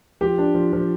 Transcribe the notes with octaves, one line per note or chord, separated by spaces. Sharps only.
F3 G4
D4
F3
F3